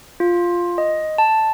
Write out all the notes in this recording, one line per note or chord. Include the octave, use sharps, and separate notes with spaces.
F4
D#5
A5